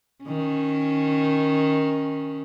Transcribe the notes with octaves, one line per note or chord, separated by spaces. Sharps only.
D#3 C#4